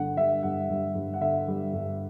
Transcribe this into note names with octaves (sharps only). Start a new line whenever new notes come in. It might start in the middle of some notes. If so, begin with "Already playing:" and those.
Already playing: G2 D3 F#5
G3 E5
G2 F#5
G2
G2
F#5
D3 E5
G3
G2